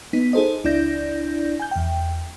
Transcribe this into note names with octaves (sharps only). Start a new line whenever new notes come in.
B3 D#4 B6
D#4 G#4 A4 C5 D#5
C#2 D4 E4 D5 G6 A#6
G#5 G6
E2 G5